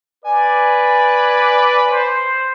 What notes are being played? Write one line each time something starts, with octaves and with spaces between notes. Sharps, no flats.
B4 D5 G#5
C5